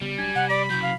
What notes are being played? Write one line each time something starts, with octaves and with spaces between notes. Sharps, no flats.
C#3 G3 B3
C#2 F#3 D4 G#5
C3 F#5
D5 B5
C#3 F#3 G6
F5